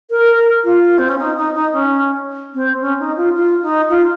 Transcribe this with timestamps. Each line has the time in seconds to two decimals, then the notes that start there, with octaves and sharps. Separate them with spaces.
0.11 A#4
0.64 F4
0.98 C4
1.09 C#4
1.19 D#4
1.36 D#4
1.55 D#4
1.73 C#4
2.54 C4
2.81 C#4
2.99 D#4
3.17 F4
3.36 F4
3.62 D#4
3.90 F4